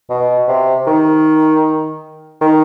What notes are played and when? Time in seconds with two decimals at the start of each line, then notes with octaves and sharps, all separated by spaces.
0.09 B2
0.48 C3
0.87 D#3
2.41 D#3